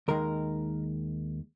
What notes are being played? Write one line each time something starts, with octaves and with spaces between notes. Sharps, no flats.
D#2 D#3 G#3 A#4